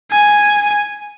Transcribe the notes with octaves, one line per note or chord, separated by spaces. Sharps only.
G#5